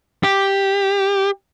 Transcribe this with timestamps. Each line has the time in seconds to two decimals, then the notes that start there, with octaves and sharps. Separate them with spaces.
0.23 G4